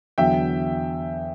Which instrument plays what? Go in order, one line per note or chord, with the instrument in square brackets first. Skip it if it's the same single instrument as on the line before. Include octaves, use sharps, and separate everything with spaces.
[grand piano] E2 D3 F#3 E5 G5